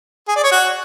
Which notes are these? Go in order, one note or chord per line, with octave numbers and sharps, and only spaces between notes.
G#4
D5
C#5
F#4